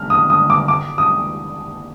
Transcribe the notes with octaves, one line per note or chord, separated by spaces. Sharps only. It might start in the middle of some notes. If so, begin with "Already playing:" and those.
Already playing: F6
D#6
D#6
D6
D6
D#6